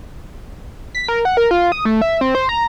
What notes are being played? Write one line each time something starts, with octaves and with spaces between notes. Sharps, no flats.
B6
A#4
F#5
A#4
F4
D#6
A3
E5
C4
C5
A#5